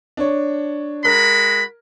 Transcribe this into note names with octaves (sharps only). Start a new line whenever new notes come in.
D4 C#5
G#3 F#4 A#4 B5